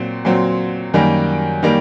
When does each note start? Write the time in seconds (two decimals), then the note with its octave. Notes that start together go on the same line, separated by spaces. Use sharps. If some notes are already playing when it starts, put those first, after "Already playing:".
Already playing: A#2 F#3 C4
0.25 A#2 F#3 C4
0.94 F#2 D#3 G3 A#3
1.63 D#3 G3 A#3